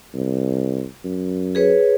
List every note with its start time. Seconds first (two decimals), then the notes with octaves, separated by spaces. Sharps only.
0.14 C2
1.04 F#2
1.55 G#4 B4 C#5